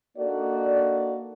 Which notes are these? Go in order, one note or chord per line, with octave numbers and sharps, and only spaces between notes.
A#3 D4 D#4 F#4 A4 D5